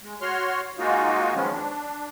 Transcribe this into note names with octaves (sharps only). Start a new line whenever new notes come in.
G#3
F#4 C#5 C6 F6
G#3 A#3 D#4 F4 F#4
D#3 F3 F#3 G#3 B3 C#4
D4